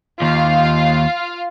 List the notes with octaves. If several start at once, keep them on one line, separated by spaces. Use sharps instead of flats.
D#2 F4 F5